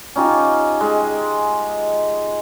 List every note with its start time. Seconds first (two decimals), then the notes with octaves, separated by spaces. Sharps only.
0.16 C#4 D#4 F4 G4
0.80 G#3